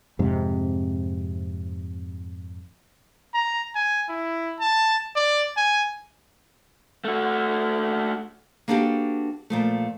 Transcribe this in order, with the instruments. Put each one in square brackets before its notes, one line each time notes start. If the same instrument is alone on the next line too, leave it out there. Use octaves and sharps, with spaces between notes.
[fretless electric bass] F2 G#2 C3
[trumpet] A#5
G#5
E4
A5
D5
G#5
[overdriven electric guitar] A3 F#4
[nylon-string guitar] A#3 B3 D4 F#4 G4 A4
A#2 F3 A3